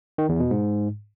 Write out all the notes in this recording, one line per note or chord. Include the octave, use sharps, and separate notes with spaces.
D#3
E2
B2
G#2